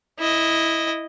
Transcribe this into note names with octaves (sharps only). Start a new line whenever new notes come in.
E4 D#5